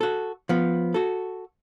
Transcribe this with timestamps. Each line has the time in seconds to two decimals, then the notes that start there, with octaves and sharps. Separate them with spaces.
0.01 F#4 A4
0.49 F3 B3
0.94 F#4 A4